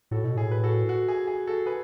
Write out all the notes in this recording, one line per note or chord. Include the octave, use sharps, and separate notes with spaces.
A2 F#4 A4
B2
A2 G#4
B4
F#4 A4
F#4
G#4
G#4
F#4 A4
G#4 B4